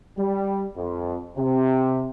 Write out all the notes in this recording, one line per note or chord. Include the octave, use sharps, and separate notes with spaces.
G3
F2
C3